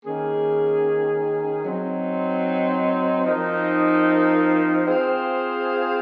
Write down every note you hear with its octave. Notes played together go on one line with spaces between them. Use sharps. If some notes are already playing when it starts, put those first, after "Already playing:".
D#3 A#3 C#4 G#4
F#3 C4 D#4
F3 C4 D#4 A#4
C4 F4 G#4 C5 F5